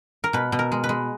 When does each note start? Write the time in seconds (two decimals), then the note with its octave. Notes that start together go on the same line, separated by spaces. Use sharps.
0.24 A#4
0.33 B2 B4
0.52 B2
0.59 A#4
0.72 G#3
0.84 B4
0.89 G#3